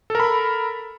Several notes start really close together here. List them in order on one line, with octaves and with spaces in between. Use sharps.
A4 A#4 B5